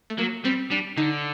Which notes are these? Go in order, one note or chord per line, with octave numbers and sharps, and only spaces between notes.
A3
F#3 A#3
G3 C4
G3 D4
D3 D#4